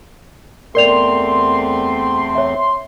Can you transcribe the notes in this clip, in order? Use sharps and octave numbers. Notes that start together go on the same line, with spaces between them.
E2 A3 C4 A#4 D5 C6 F7
C#5 E5